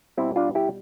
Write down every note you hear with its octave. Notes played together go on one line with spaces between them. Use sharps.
B2 G3 C4 E4
D4 F4
E4 G4